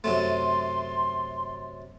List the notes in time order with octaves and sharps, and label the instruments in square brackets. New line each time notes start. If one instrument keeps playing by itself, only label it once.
[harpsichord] F#2 C3 A3 [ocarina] C6